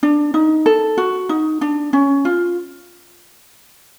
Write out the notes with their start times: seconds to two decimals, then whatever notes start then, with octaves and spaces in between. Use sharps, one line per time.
0.03 D4
0.34 D#4
0.66 A4
0.98 F#4
1.29 D#4
1.61 D4
1.93 C#4
2.25 F4